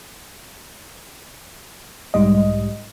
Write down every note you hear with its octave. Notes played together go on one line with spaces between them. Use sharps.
B1 G#2 G3 D#5